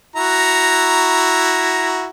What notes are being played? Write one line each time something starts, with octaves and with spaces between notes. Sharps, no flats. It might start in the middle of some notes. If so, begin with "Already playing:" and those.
E4 F#4 A#5